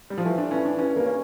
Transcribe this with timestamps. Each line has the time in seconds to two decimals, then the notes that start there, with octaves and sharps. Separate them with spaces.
0.10 G3
0.18 F3
0.24 E3 A3
0.38 D4
0.51 E3 C#4
0.65 D4
0.79 G2 C#4
0.96 A#3
1.05 C#4